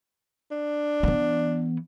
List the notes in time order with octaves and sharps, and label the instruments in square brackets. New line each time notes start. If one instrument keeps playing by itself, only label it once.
[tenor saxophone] D4
[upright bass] E3 B3